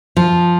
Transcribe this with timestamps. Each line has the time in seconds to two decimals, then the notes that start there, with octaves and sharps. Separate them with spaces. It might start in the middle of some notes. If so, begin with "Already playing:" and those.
0.17 F3